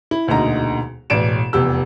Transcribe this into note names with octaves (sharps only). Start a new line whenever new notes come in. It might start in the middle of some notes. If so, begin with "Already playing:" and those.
E4
E1 D2 A#2 D3 D#4 A#5
E1 A1 D5 D7 E7
F1 E2 G4 E6